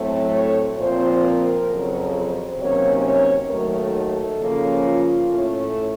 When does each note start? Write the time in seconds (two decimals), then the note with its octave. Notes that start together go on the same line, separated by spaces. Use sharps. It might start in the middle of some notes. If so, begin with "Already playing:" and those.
Already playing: A2 F#3 A3 C4
0.33 C#5
0.78 A#2 F3 C4 C5
1.24 A#4
1.69 F2 C#3 F#3
2.13 C5
2.59 C3 D#3 F#3 A#3 C#4 C#5
3.04 C#5
3.49 D#2 D#3 F#3 A3 A#4
3.94 A4
4.39 C#3 F3 A#3 C#4
4.84 F4
5.30 A2 A3 C#4